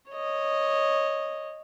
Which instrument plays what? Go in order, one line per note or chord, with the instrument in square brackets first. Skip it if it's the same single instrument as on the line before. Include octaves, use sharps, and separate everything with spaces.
[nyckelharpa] C#5 D#5